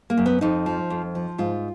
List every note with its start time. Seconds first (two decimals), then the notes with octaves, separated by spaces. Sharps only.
0.10 A#3
0.18 F#2
0.26 B3
0.41 F2 D#4
0.66 F3
0.90 F2
1.15 F3
1.38 G#2 F4